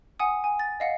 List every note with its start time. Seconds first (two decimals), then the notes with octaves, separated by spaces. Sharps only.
0.20 F#5 G#5 D#6
0.44 G#5
0.59 A6
0.80 D#5 F5 F#5